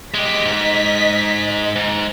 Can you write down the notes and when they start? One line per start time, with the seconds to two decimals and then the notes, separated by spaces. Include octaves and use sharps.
0.14 G#3 G4 D#5 B6
0.45 G#2
1.76 G#2